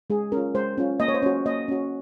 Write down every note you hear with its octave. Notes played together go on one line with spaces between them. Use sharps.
G#3 G#4
C#4 A#4
F4
G#3 C5
C#4 F4
A#3 D#5
C#5
C5
C#4 F#4 C#5
A#3 D#5
C#4 F#4